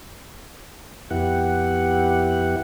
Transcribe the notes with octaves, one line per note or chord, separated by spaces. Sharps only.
F2 B3 E4 G4 F#5